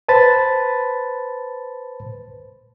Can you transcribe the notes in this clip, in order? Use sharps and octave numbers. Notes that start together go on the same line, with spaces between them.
B4 C5 A5 B5 A6